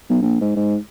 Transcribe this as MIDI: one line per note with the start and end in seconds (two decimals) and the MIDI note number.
0.10 0.19 35
0.22 0.38 34
0.41 0.53 44
0.56 0.77 44